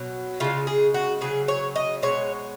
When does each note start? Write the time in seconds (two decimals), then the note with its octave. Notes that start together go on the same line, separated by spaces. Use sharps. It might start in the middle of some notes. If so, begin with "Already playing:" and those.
Already playing: B2 F#3
0.40 C#3 G#3 F4
0.67 G#4
0.94 F#4
1.21 C#3 F#3 G#4
1.48 C#5
1.76 D#5
2.02 B2 G#3 C#5